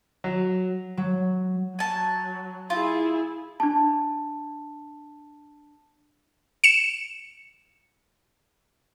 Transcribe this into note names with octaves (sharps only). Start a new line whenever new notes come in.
F#3
F#3
F#3 G#5 A5
E4 F4 G#4
D4 A5
C#7 E7